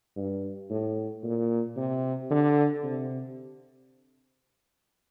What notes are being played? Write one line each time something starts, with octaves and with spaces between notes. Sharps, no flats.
G2
A2
A#2
C3
D3
C3